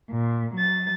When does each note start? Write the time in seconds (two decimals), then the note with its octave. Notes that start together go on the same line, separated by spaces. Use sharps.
0.11 A#2
0.54 F#3 A6